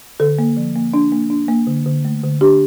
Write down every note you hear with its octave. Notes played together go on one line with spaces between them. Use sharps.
D3 A4
A#3
F3
A#3
D4
A#3
D4
A#3
D3
D3
A3
D3
D4 G4